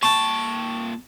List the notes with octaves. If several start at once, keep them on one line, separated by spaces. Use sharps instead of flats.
A#2 G5 A5 C#6